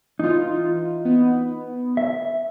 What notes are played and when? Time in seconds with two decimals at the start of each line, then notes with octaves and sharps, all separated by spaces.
0.19 E3 D#4 F4
1.05 B3
1.97 E5